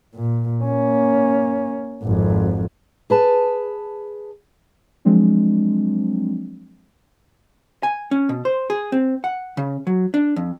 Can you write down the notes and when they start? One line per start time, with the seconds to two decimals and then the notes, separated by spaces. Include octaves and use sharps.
0.15 A#2
0.64 A#3 C#4
2.03 G#1 F2
3.10 G#4 B4 A5
5.05 F3 F#3 G#3 C4 D4
7.83 G#5
8.11 C#4
8.29 B2
8.45 C5
8.70 G#4
8.92 C4
9.24 F#5
9.57 C#3
9.87 F#3
10.14 D4
10.36 F2